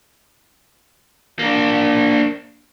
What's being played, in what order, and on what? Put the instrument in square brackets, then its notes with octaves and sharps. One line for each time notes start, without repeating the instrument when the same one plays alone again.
[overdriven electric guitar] A#3 D4